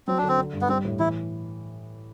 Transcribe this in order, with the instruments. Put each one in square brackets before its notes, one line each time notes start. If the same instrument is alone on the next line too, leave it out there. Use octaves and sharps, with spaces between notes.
[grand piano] F#3 [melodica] C4
[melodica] D4
[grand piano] D3
[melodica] C4
[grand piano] D3
G2
[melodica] B3
[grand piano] G3 [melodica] C4
[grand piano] A2
[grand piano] E3 [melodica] E4